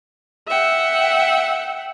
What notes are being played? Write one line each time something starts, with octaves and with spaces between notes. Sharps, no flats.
E5 F#5 G5